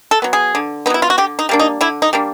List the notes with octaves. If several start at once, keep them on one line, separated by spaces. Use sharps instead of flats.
A4
F#3 B3
G#4
D3
F#3 B3 D#4 E4
F4
F#4
D3 G4
D#4
G3 A#3 D4
D#4
D3 E4
D#4
G3 A#3 D4